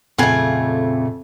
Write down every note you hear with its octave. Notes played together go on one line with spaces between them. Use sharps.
F2 A#2 C#3 A3 F4 F#5 G#5